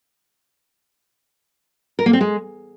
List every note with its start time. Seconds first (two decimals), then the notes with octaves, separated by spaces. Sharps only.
1.99 A#4
2.06 A#3
2.13 C4
2.21 G#3